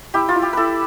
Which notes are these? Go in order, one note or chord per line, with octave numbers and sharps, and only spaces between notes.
E4 G4
F4
E4
G4
E4 A4 B4